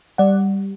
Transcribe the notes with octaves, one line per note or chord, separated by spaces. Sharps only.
G3 D5 F#5